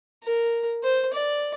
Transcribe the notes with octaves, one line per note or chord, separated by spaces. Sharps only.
A#4
C5
D5